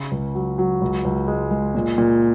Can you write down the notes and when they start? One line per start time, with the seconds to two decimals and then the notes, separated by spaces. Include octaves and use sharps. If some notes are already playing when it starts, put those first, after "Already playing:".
Already playing: C#3
0.12 C#2
0.35 F#3
0.58 F#3
0.81 C#2
1.05 C#2
1.28 G#3
1.51 G#3
1.75 A#2
1.98 A#2